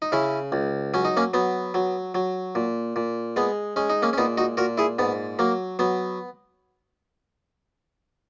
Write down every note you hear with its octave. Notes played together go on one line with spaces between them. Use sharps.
D#4
C#3 C#4 E4
C#2
F#3 C#4
D#4
A#3 C#4
F#3 B3
F#3
F#3
A#2
A#2
G#3 B3
G#3 C#4
D#4
A#3 C#4
C#4
A#2 B3 D#4
D#4 F#4
A#2 F#4 A#4
E4 G#4
G#2 B3
F#3 A#3
F#3 B3